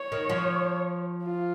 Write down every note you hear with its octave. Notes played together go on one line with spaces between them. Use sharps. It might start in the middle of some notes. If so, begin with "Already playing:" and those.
Already playing: C#5
D#3
F3
F4